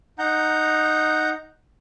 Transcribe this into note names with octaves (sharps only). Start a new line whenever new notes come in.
D#4 F#5 A#5 G6